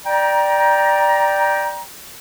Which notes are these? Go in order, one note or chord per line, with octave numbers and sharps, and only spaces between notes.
D5 G5 A#5